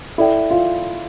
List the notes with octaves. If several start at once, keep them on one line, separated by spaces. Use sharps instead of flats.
E4 A4 D5 G5
F4